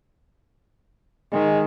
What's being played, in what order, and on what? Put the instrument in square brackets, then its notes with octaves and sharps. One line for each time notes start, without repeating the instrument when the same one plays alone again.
[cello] D#3 [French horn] G#3